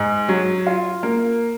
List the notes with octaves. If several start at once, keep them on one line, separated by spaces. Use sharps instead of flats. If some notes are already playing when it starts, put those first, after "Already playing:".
Already playing: G#2
F#3
F4
A#3